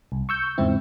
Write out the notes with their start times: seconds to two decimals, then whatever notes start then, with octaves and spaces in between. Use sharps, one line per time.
0.12 C2
0.29 C#6 E6 G6
0.58 E2 G#2 C#3 C4 E4